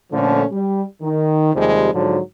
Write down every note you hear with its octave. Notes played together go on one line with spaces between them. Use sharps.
A#2 D3 F3 A3 C#4
G3
D#3
D#2 C3 F3 G3 G#3
G#2 D3 F3 F#3